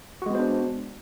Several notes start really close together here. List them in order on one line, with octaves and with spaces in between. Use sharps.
F#4 G#3 B3 C5 D4